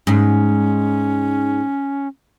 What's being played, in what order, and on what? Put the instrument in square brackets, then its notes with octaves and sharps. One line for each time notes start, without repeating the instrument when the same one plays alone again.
[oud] G#2 [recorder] C#4